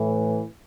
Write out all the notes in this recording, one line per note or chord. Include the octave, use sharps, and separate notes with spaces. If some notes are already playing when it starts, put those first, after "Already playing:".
Already playing: A2 E3